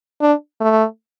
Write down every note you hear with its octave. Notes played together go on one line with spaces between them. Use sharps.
D4
A3